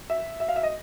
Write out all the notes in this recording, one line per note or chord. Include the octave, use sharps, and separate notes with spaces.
E5
E5
F5
E5
D#5